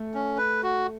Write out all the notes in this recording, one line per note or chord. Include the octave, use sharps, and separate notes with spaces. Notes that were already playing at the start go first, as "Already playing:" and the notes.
Already playing: A3
C#4
B4
F#4